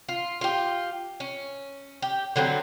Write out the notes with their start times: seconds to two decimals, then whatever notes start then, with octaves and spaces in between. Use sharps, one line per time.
0.09 F4
0.41 F4 G4
1.20 C#4
2.02 G4
2.36 D3 F#3 G3 C4